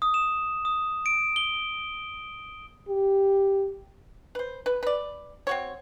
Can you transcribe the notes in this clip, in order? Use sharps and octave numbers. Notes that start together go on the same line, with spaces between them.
D#6
E7
D#6
D7
G7
G4
B4 C5
B4
B4 D5
C4 F#4 C#5